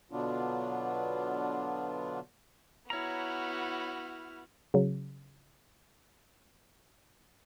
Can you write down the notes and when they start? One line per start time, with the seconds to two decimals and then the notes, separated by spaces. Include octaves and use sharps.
0.12 B2 D3 F#3 B3 D4 F4
2.90 B3 E4 F#4 C#5 A#5 F6
4.74 C#3 F#3